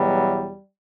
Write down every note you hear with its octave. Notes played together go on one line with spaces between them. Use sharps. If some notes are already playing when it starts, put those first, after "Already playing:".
Already playing: E2 B2 F#3 G3